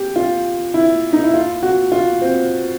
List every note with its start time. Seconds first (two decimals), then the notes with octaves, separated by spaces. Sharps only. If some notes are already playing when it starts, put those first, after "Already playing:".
Already playing: G4
0.16 F4
0.74 E4
1.13 D#4
1.24 E4
1.34 F4
1.63 F#4
1.92 F4
2.21 C4